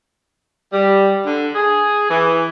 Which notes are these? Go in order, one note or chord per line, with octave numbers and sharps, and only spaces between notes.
G3
D3
G#4
E3